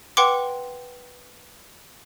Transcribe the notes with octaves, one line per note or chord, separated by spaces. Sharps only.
B4 F#5 G5 C6 D6